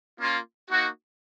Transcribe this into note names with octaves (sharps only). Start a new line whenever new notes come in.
A#3 C#4 F4
A#3 D#4 F#4